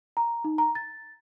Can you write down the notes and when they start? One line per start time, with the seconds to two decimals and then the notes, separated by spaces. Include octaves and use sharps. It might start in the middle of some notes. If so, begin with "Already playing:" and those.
0.17 A#5
0.44 D#4
0.58 A#5
0.75 A6